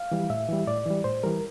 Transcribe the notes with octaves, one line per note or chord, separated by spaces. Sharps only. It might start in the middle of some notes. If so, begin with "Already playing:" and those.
Already playing: F5
E3 G3
A2 E5
E3 G3
A2 D5
E3 G3
A2 C5
E3 G3 A#4